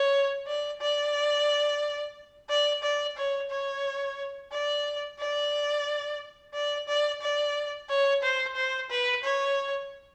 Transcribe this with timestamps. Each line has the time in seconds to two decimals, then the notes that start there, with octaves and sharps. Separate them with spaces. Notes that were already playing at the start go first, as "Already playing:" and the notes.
Already playing: C#5
0.47 D5
0.81 D5
2.49 D5
2.83 D5
3.17 C#5
3.50 C#5
4.51 D5
5.19 D5
6.54 D5
6.88 D5
7.22 D5
7.89 C#5
8.23 C5
8.56 C5
8.90 B4
9.24 C#5